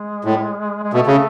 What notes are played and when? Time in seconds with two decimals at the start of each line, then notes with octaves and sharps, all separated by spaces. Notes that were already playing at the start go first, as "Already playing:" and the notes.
Already playing: G#3
0.25 A2
0.83 G#3
0.93 B2 A3
1.07 C#3